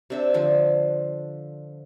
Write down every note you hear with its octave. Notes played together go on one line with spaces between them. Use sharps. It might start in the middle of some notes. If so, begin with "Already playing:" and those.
C3 D4 E5
D3 F3